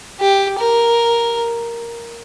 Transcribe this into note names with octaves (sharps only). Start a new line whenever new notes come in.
G4
A#4